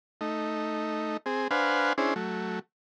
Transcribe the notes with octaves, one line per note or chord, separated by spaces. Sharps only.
A3 D#4
C4 G#4
D4 B4 C5 F5 F#5 G#5
C#4 D4 E4 G#4 C5
F#3 A3